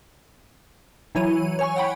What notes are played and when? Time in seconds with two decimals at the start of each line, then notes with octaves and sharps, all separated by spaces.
1.15 E3 F#3 E4 C#5 D#7
1.59 C#5 G#5 C#6
1.76 F#5 G5 B5